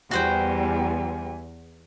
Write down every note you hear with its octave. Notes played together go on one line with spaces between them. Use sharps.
E2 G3 F#4 C5 G5 G#5